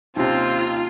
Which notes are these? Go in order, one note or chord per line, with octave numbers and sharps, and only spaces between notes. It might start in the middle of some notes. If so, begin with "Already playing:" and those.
D#2 C3 C4 C#4 D#4 F4